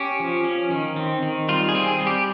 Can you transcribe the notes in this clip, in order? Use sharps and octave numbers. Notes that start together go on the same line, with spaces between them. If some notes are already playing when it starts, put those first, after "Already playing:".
Already playing: C#4 G4
F3
C#4
D#3
C4
D#3
G3 F4
G#4
C4
G#4
G3
G4